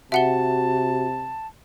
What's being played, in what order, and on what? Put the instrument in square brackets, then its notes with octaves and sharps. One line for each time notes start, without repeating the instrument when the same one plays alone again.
[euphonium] C3 [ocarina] F#4 [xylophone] E5 F#5 G7 [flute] A5